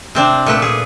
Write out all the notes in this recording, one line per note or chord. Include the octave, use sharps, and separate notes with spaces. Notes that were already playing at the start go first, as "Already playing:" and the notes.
C3 C4 D4
A#2 A3 B4
G#4